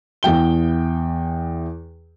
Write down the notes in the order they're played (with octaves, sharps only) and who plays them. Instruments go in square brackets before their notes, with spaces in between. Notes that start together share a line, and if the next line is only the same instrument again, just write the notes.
[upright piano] E2 E3 G5 G7